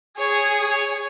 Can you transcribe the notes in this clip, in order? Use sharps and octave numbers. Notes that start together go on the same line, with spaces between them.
G#4 C#5